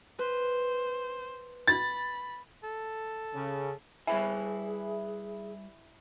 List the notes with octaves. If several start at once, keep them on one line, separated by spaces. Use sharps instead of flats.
B4 C5
B5 A6
A4
C#3
G3 E4 G#4 B4 E5 G#5